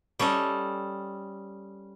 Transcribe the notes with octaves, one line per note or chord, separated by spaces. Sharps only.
G3 C#4 A4 D#5